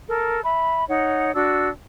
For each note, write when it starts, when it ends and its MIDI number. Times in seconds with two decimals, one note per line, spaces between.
0.08 0.41 69
0.08 0.41 70
0.43 0.84 76
0.43 0.84 83
0.88 1.34 63
0.88 1.34 73
0.88 1.34 78
1.34 1.68 62
1.34 1.68 66
1.34 1.68 88